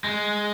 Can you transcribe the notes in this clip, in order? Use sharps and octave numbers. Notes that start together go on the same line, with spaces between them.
G#3